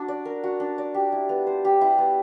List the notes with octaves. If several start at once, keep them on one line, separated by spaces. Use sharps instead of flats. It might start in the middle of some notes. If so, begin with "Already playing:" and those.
Already playing: D4 F#4
D5
A#4
F#4
D4
D5
G4
E4
B3
C5
G4
E4
B3